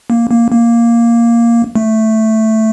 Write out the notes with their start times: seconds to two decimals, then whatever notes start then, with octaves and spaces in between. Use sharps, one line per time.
0.10 A#3
0.31 A#3
0.51 A#3
1.76 A3